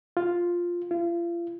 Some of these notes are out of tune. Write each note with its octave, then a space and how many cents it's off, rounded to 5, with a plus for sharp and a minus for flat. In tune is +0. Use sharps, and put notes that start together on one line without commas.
F4 +5
F4 -35